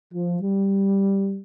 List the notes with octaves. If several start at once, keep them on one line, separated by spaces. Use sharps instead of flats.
F3
G3